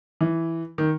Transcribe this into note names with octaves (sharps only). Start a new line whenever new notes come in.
E3
D#3